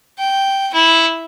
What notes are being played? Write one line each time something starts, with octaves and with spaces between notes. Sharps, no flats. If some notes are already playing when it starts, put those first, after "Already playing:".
G5
E4